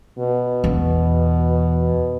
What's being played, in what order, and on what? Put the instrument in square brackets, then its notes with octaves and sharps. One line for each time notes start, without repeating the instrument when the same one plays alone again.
[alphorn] B2
[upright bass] E2